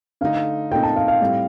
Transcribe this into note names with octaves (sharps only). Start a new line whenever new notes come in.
D3 A3 D#4 F5
A#2 A3 C4 D#4 G5
A5
F5
F5
A2 G3 C4